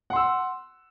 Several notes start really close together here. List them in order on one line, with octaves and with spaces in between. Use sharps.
F#5 C6 E6